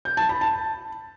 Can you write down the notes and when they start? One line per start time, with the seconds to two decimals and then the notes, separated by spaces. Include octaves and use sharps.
0.05 G6
0.17 A5
0.29 B5
0.41 A5